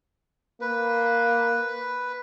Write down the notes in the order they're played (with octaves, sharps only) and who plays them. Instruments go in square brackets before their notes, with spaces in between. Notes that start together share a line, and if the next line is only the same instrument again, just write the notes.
[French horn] A#3 [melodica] B4